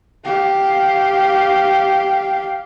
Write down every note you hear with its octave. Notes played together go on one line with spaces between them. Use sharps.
G4 F5